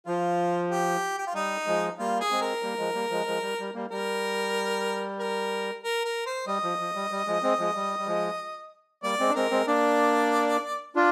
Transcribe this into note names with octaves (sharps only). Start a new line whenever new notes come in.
F3 F4
G4
G4
F4
G3 D#4
F3 G#3
G3 A#3 F4
G#4
G#3 C4
A#4
G3 A#3
F3 G#3
G3 A#3
F3 G#3
F3 G#3
G3
G3
G3 A#3
G3 A#4
A#4
A#4
A#4
C5
G3 D#5
F3
F3
G3
G3
F3 G#3
G#3 C4
F3 G#3
G3
G3
F3 G#3
G3 A#3 D5
G#3 C4
D4
G#3 C4 A#4
G#3 C4
A#3 D4 D5
D4 F4 D5